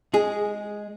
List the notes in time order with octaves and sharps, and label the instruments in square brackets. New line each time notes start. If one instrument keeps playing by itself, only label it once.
[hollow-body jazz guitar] G#3 G#4